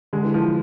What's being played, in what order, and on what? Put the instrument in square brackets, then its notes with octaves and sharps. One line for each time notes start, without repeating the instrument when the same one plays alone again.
[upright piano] D3 [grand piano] G#3
[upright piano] E3
[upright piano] E3 [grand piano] F3
[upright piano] E3